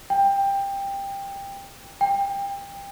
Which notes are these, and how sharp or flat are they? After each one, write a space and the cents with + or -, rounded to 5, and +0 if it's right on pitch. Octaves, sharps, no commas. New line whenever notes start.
G5 +15
G5 +25